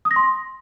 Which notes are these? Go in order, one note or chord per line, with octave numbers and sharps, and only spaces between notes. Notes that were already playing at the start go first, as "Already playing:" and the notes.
D#6
A#6
C6